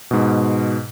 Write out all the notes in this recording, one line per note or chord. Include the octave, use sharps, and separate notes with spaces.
G#2 B2